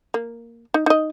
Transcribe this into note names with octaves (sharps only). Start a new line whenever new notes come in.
A#3
D#4
D#4 D#5